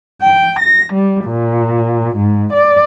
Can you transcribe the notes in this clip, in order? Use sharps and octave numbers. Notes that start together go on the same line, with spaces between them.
G5
A#6
G3
A#2
G#2
D5